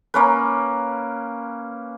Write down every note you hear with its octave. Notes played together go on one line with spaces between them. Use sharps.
A#3 C#4 B4